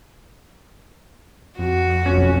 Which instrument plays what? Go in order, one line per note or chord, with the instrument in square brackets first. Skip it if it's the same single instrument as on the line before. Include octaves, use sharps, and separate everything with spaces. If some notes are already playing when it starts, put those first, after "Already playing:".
[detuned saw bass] F2 [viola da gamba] F#4
[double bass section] F1 B1 [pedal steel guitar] C#4